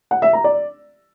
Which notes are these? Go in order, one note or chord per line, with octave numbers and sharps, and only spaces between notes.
F#5
E5
A#5
D5